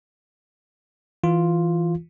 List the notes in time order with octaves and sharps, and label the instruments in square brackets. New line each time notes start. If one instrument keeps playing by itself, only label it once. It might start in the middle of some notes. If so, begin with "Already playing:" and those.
[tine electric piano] E3 F4